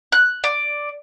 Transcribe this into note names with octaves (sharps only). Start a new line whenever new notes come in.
F#6
D5